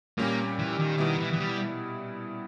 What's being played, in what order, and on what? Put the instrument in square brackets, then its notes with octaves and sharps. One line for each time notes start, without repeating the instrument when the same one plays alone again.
[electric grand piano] A#2 G3 C#4 G4 [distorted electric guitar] A#3
[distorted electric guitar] E3
D#3
[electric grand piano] B2 G3 B3 E4 [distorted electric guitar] D#3
[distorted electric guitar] E3
E3
G3